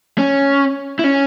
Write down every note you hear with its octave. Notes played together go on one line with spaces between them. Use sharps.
C#4
E4
C#4